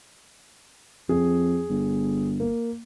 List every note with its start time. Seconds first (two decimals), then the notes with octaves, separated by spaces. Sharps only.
1.09 F2 G#4
1.70 G1
2.40 A#3